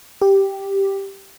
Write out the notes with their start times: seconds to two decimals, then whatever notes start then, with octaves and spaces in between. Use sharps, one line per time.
0.22 G4